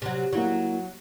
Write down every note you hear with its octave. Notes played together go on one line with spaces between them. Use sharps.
C3 F#3
F#3 A#3 E4 F#4